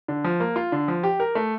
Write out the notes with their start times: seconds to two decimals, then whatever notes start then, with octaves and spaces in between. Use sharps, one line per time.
0.08 D3
0.24 F3
0.40 A#3
0.56 F4
0.72 D3
0.88 F3
1.03 G4
1.20 A#4
1.35 A3